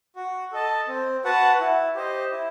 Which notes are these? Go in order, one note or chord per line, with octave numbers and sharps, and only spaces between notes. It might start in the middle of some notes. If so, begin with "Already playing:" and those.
F#4
A4 D#5 A5
C4
F#4 B4 F#5 A5
E4
G4 C5 D#5
E4